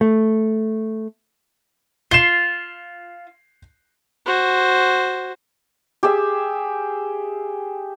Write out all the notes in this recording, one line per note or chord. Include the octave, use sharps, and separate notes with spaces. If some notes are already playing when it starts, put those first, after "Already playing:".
A3
F4 C7 E7
F#4 C5
G4 G#4 E5